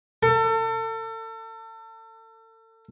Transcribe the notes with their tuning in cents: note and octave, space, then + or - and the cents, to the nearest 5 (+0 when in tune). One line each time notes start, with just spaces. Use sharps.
A4 +35